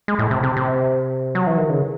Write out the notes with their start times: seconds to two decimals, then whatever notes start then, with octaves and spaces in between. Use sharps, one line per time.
0.08 G#3
0.19 A2
0.31 C3
0.43 C3
0.57 C3
1.35 F#3
1.47 E3
1.58 D#3
1.70 C#3